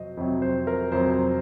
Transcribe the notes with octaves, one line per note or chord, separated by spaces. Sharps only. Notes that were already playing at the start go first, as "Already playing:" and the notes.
Already playing: F2 C3 F#3 C5 D#5
F2 C3 F#3
C5
A#4
F2 C3 F#3 C5